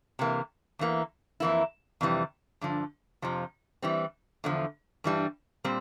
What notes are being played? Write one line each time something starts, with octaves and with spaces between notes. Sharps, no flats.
C3 E3 A#3
E2 E3 A#3
F2 E3 A#3 E4
F2 C3 E3 G3
G2 D3 F3
F2 C3 F3
E3 G3 C4
E2 D3 F3
G2 E3 G3 D4
A#2 G3 C4